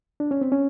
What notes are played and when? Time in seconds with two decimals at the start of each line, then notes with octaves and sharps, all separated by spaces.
0.20 D4
0.31 C#4
0.41 C4
0.52 C#4